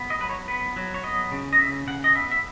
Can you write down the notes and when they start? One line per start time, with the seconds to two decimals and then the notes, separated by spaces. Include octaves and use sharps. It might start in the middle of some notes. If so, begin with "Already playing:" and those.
Already playing: B3
0.10 D#5
0.20 F#3 B4
0.29 C#5
0.48 B3 B4
0.76 F#3
0.94 C#5
1.03 B3 D#5
1.32 C#3
1.53 D#5
1.59 C#3 E5
1.87 C#3 F#5
2.04 D#5
2.15 B3 E5
2.31 E5